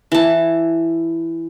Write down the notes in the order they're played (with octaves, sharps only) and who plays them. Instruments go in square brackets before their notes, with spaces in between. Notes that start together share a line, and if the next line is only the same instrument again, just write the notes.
[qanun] E3 A5